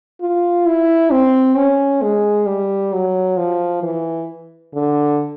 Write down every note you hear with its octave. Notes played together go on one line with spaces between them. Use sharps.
F4
E4
C4
C#4
G#3
G3
F#3
F3
E3
D3